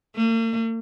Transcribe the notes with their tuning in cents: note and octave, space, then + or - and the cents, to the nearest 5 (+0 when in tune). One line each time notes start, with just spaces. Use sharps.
A#3 -45